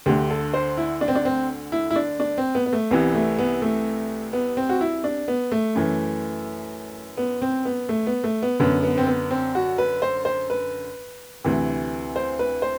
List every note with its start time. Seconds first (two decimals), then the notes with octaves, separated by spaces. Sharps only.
0.06 D2 D3 G4
0.30 A4
0.54 C5
0.77 E4
1.01 D4
1.08 C4
1.15 D4
1.25 C4
1.72 E4
1.90 E4
1.96 D4
2.20 D4
2.38 C4
2.55 B3
2.66 B3
2.73 A3
2.91 C2 C3 E3 B3
3.14 A3
3.39 B3
3.62 A3
4.33 B3
4.57 C4
4.69 F#4
4.81 E4
5.04 D4
5.28 B3
5.52 A3
5.75 F#2 E3
7.17 B3
7.42 C4
7.65 B3
7.89 A3
8.07 B3
8.24 A3
8.42 B3
8.60 F#2 D3 B3
8.83 B3
8.98 C4
9.07 B3
9.31 C4
9.55 F#4
9.78 B4
10.02 C5
10.25 C5
10.50 B4
11.45 D2 C3 E3
12.16 C5
12.39 B4
12.62 C5